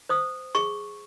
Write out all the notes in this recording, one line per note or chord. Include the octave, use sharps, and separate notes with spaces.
C5 D#6
G#4 C#6